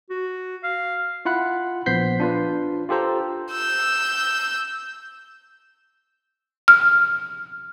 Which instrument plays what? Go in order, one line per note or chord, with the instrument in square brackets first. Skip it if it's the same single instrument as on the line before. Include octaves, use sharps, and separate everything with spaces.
[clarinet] F#4
F5
[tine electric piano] E4 F4 F#5 B5 F#6
A#1 B3 C5 G6 B6 C7
D4 F4 B4
F4 G4 A4 C5 A#5
[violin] E6 G6
[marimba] F6